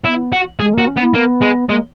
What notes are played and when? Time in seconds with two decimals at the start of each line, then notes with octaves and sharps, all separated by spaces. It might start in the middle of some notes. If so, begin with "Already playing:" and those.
0.05 B3 E4
0.33 F#4
0.60 G#3 G#4
0.73 A#3
0.78 F#4
0.87 C#4
0.97 B3
1.02 E4
1.14 A#3 B3
1.42 G#3
1.70 G#3 A#3